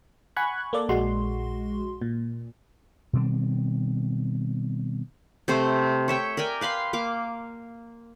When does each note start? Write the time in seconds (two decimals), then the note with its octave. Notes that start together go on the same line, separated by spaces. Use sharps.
0.36 F#5 G#5 B5 C#6 F#6 G#6
0.73 A#3 A4 D5
0.89 A#1 G#3 F#4 C6
2.01 A#2
3.13 B2 D#3 G3 C4
5.48 C3 A3 C5
6.08 C#5 E5 G5
6.37 A#4 D5 G5 G#5
6.61 B4 F5 B5 C6
6.93 A#3 F5 D6